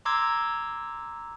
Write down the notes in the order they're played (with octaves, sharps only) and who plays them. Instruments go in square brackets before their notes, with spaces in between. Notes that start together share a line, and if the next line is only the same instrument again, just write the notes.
[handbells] A#5 C6 D6 E6 G#6